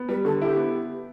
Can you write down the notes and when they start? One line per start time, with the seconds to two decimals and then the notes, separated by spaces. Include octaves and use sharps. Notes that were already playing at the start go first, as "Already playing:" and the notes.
Already playing: B3
0.09 G3 B4
0.25 D3 A4
0.41 E4 G4
0.57 B3